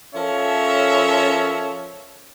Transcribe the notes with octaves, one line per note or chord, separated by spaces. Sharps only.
F3 C#4 A4 A#4 C#5 E5